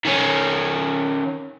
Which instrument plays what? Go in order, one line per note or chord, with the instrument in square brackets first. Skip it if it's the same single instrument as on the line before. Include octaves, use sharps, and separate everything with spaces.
[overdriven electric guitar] D#3 C#4